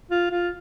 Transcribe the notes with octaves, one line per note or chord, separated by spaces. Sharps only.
F4
F4